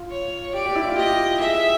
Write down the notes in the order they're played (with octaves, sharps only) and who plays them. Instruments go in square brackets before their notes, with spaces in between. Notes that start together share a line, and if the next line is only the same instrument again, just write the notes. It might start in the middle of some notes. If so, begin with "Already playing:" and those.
Already playing: [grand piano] F4
[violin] C#5
[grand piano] G4 [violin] D5
[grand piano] G4
E4
F4
[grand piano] G4 [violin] D#5
[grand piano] G#4 [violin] E5